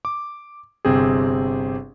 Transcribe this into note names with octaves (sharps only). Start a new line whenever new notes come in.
D6
G1 C3 C4 G4 G#4